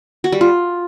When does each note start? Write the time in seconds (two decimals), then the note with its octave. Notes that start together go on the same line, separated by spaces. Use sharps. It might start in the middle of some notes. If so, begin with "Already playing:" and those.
0.24 F#4
0.32 G3
0.41 F4